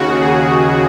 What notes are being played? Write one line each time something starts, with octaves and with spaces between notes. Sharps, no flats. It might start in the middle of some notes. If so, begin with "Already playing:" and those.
Already playing: D#2 C#3 F#4
G#4